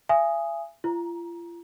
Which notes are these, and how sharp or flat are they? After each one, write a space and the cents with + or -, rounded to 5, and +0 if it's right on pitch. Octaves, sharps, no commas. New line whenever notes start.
E5 +40 G#5 +0 D#6 +0
F4 -40 A#5 +20